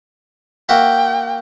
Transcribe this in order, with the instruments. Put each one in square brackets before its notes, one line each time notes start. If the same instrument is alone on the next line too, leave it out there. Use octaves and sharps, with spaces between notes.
[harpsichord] A#3 F#4 E5 [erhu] G5